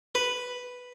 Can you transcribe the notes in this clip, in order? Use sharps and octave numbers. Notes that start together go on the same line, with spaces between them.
B4